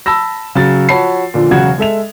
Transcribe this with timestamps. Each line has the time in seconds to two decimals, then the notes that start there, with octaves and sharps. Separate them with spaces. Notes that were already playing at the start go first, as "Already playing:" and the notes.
0.06 A5 B5 E6 A#6
0.55 C#3 F#3 A6
0.89 F3 F#4 C#5 A5 B5 C7
1.34 A#2 D3 F3
1.51 E1 C#3 F#3 F#4 G#6
1.78 G#3 A4 E5 F7